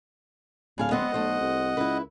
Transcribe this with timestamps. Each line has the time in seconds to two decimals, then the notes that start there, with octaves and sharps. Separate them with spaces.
0.78 D1 A2 G#4 F5
0.91 G#3 B3 C4 D#5 F#5
1.14 B1 A3 C5
1.41 C2
1.77 C#2 E4 B4